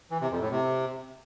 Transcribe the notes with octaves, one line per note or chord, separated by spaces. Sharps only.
E3
C3
F2
A2
C3